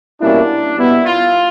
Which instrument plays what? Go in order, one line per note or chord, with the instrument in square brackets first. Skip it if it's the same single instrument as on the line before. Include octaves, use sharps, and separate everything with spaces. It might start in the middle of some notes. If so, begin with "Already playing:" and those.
[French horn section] B2 G3 A#3 C#4 E4 [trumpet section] D4
[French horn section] B2 G3 B3 [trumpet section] E4
[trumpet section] F4